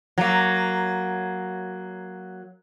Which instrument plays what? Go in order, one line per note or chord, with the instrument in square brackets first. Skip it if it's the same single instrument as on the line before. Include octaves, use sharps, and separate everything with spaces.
[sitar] F#3 A#3